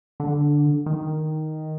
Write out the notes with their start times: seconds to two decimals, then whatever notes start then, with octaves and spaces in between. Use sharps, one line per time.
0.20 D3
0.86 D#3